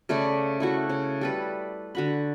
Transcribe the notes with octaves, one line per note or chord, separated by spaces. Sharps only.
C#3 A3 D5 B5
A3 E4 F#4
C#3
G3 A4 B4
D3 F#4 B5